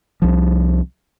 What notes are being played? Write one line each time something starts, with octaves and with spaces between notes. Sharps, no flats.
C2 F3